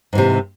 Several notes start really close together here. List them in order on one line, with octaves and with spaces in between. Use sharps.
G#2 E3 C3